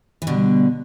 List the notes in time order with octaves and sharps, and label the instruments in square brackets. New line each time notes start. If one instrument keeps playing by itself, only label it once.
[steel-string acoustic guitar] E3
[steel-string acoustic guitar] B2 D3 [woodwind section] G3